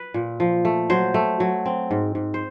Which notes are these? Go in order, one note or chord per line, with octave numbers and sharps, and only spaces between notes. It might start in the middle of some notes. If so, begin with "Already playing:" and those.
Already playing: B4
A#2
F3
A3
F#3 C5
A3
F#3
C4
G#2
G#2
C5